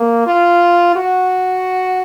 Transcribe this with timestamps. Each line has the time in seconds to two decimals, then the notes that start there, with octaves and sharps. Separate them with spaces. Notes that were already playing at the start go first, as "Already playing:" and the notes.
Already playing: A#3
0.27 F4
0.96 F#4